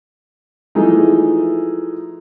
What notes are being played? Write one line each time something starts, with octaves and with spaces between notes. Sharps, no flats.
E3 F3 G#3 A3 D#4